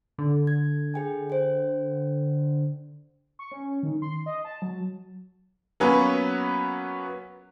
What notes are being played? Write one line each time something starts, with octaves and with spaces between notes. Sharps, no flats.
D3
G#6
G#4 G5 G#5
C5 G5
C#6
C#4
D#3
C6
D#5
A5
F#3
F#3 A#3 B3 C#4 B4